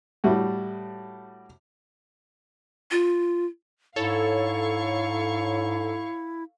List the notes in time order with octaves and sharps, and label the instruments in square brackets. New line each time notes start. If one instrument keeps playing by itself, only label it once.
[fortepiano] A2 G3 F#4
[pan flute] F4
[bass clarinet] G#2 [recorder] E4 [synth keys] A4 C#5 [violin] F5 C#6